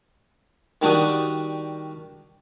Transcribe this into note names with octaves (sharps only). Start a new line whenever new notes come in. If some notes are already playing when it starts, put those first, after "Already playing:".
D#3 G3 D4 F#4 G5 D#6